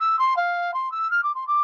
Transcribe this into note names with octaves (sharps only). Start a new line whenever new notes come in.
E6
C6
F5
C6
E6
F6
D6
C6
D6